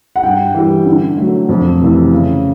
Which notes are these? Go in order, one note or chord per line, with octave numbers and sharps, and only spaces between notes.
F#5
G2 G5
E3 G3
D3
F#3 A3
F2
C3 E3 A3
C#3